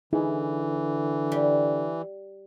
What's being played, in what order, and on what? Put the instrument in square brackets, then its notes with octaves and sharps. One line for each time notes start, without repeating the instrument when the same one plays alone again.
[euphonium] D3 [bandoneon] E3 [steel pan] D#4 E4 G#4
[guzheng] G3